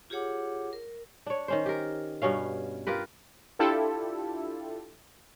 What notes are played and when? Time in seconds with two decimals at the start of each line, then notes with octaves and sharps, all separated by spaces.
0.10 F4 G4 G#4 C#5 F#5 D6
0.73 A#4
1.26 D4 C#5
1.48 D#3 C#4 C5
1.66 G4 A#4
2.22 G2 B2 C#4 F5
2.87 F4 G4 A#4 B4
3.59 D4 E4 F4 G4 A4